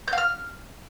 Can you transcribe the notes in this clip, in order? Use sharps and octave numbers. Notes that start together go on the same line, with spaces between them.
G6
F5
F6